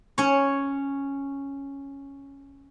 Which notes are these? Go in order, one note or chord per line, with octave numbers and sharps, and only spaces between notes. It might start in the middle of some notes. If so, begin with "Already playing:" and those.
C#4 C#5